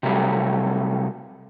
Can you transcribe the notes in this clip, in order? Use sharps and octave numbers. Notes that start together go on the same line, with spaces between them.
C3 F#3 G3 A3